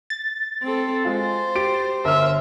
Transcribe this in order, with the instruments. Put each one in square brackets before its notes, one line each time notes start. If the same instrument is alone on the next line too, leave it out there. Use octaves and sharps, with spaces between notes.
[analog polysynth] A6
[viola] C4 A4
[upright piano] G#3 F4 [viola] C5
[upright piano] G4 D7
[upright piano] G1 G4 [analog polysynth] A#4 F6 [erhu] E5